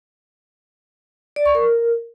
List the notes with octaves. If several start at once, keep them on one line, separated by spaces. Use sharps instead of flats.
D5
C#6
A#4